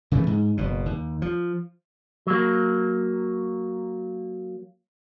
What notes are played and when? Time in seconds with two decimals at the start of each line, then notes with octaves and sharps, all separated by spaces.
0.12 C#3 E3 G#3 A3
0.27 G#2
0.57 F#1 B2
0.86 D#2
1.22 F3
2.27 F#3 A#3